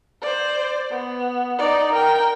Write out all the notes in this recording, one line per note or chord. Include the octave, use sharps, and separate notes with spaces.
C5 D5
B3
D#4 D5
A#4 G5